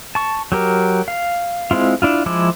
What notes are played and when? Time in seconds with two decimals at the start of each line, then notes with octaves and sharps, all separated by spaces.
0.15 A5 C#6
0.52 F#3 G4 A#4
1.08 F5
1.71 G#3 C4 E4 F4
2.02 D4 E4 F4
2.26 F3 G#3 E4 D6